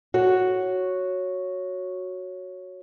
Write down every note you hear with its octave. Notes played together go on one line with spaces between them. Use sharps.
F#4 C#5